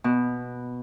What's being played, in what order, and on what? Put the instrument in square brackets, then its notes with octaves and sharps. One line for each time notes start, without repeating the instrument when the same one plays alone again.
[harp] B2